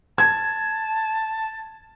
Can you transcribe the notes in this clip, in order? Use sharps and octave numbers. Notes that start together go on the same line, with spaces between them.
A5 G#6